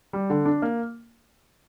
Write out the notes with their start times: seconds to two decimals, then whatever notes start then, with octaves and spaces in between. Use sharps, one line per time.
0.13 G3
0.30 D3
0.45 D4
0.62 A#3